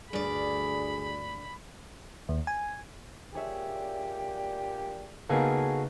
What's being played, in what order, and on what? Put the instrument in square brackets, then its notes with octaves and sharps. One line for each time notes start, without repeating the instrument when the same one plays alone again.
[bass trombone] D2 [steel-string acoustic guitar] G2 D5 [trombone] G#4 [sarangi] B5
[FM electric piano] D#2
G#5
[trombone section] A#2 D4 G4 [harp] G#4 C#5 E5
[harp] C#3 F5 [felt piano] A#3 B3 D#4 [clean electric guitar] F#4 G#4 A4